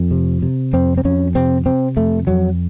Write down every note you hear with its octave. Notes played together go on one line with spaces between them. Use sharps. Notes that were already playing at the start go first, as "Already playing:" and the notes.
Already playing: F2
C3
C3
F2 C4
C4
F2 C#4
C3 C4
C3 C4
F2 A3
F2 F#3